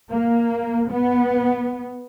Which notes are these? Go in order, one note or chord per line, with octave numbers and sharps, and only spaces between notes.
A#3
B3